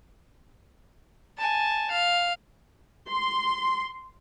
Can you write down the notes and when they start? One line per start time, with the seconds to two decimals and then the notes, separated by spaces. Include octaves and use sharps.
1.38 G#5 A5
1.91 F5
3.10 C6